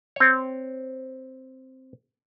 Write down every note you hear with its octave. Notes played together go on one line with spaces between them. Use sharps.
C4 C#5